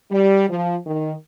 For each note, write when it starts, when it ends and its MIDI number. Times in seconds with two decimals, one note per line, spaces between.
0.11 0.45 55
0.50 0.76 53
0.86 1.13 51